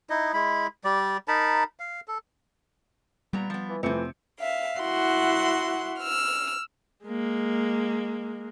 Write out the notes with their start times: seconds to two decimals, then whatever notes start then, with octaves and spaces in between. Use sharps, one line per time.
0.10 D#4 E4 D#5
0.33 G#3 E4 B5
0.84 G3 D5
1.28 D#4 A#4 A5 B5
1.80 F5
2.08 A4
3.33 A#2 G3 B3 A#5
3.50 F3 B3
3.69 E3
3.83 F2 C3 E3 A3 C4 C#7
4.40 E5 F5
4.80 E4 F#4 F#5 C6
6.00 E6 F6
7.04 G#3 A#3